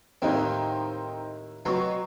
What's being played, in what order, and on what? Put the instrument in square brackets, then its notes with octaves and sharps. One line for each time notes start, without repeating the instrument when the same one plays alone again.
[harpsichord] D#2 A2 D#3 [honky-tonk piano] C4 D#4
[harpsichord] B2 C4 [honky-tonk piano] F#3 C#6